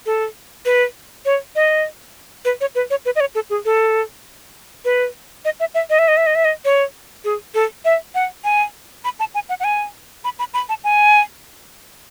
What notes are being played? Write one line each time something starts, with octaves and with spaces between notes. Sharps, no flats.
A4
B4
C#5
D#5
B4
C#5
B4
C#5
B4
D#5
C#5
A4
G#4
A4
B4
D#5
E5
E5
D#5
E5
D#5
E5
D#5
E5
D#5
C#5
G#4
A4
E5
F#5
G#5
B5
A5
G#5
F#5
F#5
G#5
B5
B5
B5
A5
G#5